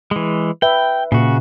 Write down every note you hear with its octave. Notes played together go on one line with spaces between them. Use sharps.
E3 G#3
B4 E5 G5
A#2 C#3 F#4